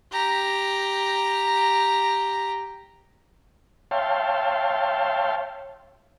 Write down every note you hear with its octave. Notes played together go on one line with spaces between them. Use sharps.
G4 A#5
C#5 E5 F5 G5 A5 C6